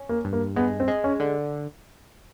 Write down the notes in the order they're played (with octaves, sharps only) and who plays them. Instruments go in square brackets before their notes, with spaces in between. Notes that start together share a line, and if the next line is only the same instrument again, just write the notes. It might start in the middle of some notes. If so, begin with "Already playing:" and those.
Already playing: [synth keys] C#4
[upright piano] A#3
[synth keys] G2
[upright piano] A#3
[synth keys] G#3 [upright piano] B3
[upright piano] C4
[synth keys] G#3
[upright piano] C#4
[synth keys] D3